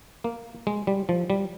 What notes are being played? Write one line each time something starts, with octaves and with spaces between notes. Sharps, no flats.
A#3
G#3
G3
F3
G3